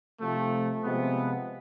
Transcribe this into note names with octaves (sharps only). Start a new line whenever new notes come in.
C3 F3 A3
C3 F3 G#3 B3